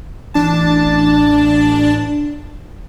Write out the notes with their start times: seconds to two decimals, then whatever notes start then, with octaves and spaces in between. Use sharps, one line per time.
0.34 A1 D4 A5